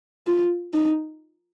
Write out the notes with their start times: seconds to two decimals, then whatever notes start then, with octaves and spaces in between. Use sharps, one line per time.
0.27 F4
0.74 D#4